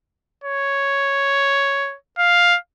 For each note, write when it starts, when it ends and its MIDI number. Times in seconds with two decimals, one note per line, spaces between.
0.44 1.96 73
2.19 2.57 77